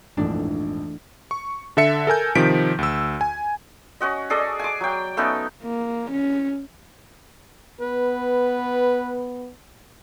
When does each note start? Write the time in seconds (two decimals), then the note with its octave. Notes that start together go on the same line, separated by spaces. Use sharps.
0.17 A#1 F2 G#2 E3 A3 D4
1.31 C#6
1.77 D3 A4 E5 C#7
2.07 A4 A#4 G#5 G6
2.35 C3 D#3 F3 B6 D7
2.79 D2 E6
3.21 G#5
4.01 C#4 F#4 D#5
4.30 G#4 A4 D5 D#5
4.59 G#5 D6
4.81 F#3 G5
5.17 A3 B3 C#4 D#4
5.63 A#3
6.11 C#4
7.81 B3 B4